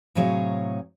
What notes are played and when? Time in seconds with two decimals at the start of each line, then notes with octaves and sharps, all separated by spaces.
0.15 A2 C3 F#3 G#4 C#5 F5